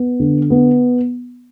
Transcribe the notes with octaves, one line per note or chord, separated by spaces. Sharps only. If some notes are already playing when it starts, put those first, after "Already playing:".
Already playing: B3
D3
B3